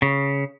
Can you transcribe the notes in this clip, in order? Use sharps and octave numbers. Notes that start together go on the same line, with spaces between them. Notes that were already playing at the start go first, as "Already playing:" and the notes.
C#3